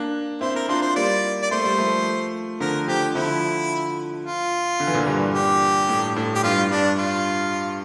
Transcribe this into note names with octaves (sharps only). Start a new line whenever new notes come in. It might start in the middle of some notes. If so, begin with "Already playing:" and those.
Already playing: A#3 D4
C4 E4 C5
A#4
D4 F4 C5
C5
G3 A#3 D5
D5
A3 C5
G3
F3 A3
D3 F3 A#4
D3 F3 G4
D3 F3 E4
F4
D3
E3
A#2 D3
G2 A#2
G4
A2
A2
G4
G2 F4
G2 D4
F4